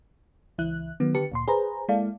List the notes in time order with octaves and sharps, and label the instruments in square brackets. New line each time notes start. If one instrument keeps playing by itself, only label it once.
[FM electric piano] C#2 E3 E4 F#6
D#3 F#3 B3
D3 G4 B4 A5 C#7
D2 A#2 C6
G#4 B4 C5 A#5
G#3 A#3 E4 A4 D5 F5